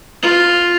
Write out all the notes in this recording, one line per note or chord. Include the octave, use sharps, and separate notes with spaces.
F4